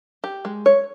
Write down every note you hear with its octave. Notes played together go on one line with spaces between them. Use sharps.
G4
G#3
C#5